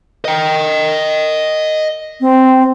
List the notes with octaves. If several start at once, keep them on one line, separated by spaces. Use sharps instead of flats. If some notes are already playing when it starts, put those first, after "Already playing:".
D#5 G5
C4